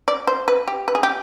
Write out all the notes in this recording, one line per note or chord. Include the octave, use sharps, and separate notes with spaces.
D5
C5
B4
G4
B4
G#4
G4